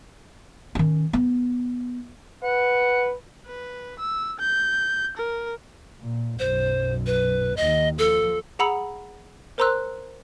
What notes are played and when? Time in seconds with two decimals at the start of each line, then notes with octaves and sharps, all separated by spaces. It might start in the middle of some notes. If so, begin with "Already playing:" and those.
0.75 D#3 C#4
1.13 B3
2.43 B4 F#5
3.46 B4
3.99 E6
4.40 G6
5.17 A#4
6.00 A#2
6.39 B1 F#2 C5
7.06 B4
7.57 D#2 D#3 D#5
7.98 F3 A4
8.59 G#4 F#5 A#5 B5 E6 C#7
9.58 A#4 C5 A#5 C6 E6 F#6